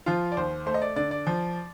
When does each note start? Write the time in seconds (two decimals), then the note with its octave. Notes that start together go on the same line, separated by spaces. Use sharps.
0.06 F3 F4
0.32 D5
0.37 D#2 C5
0.66 A3 C5
0.74 D#5
0.82 D5
0.96 D3 D5
1.11 D5
1.27 F3